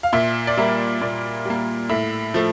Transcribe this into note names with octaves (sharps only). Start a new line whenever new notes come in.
F5
A#2 E5
D5
G3 A#3 E5
A#2 D5
G3 A#3
A2 E5
F3 A3